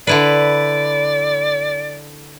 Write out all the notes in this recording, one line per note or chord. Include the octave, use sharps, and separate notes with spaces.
D3 E4 B4 D5